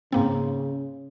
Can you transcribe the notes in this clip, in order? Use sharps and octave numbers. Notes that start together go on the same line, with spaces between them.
G#2 C#3 A#3 C4